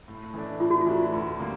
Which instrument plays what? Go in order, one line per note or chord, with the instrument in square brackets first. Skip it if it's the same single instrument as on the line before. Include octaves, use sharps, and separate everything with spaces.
[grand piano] A2
E3 A3 D4
[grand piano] A2 [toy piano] F4
[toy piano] F#4
F4
[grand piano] E3 A3 D4
D2
D3 G3 A#3